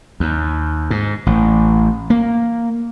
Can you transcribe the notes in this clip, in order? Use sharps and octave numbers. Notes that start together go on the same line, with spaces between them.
D#2
G#2
A1
A#3